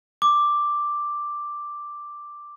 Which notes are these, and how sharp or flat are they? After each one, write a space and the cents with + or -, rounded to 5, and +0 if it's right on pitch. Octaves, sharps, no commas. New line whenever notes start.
D6 +5